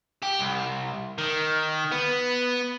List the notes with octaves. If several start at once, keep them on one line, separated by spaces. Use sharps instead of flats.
G4
C2
D#3
B3